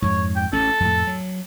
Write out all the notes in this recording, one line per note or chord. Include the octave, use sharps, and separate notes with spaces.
F2 G#2 C#5
G5
A1 C#4 A4
F2 A2
F#3